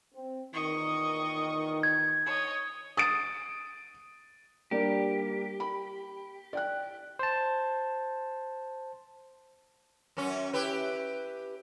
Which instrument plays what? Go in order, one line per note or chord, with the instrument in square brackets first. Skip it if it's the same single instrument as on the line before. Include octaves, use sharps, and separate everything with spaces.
[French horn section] C4
[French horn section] E2 A#2 D#3 [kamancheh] D#5 C#6
[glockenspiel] G#6
[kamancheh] C#5 D#5
[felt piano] D#6 A6 D7
[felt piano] G3 A#3 D4 [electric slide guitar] G4
[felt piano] B5
D5 G5 F#6
[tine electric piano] C5 A5
[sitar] F#2 C#4
E4 G4 B4